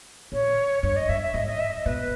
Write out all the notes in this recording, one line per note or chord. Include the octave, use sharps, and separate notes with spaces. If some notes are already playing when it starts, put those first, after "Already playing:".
A#2 C#5
G2 C#5
D#5
G2 E5
E5
G#2 D#5
D#5
E5
D#5
B2 B4